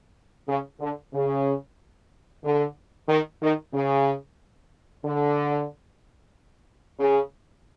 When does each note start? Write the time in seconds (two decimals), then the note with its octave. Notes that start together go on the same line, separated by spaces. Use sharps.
0.48 C#3
0.81 D3
1.14 C#3
2.44 D3
3.09 D#3
3.42 D#3
3.74 C#3
5.05 D3
6.99 C#3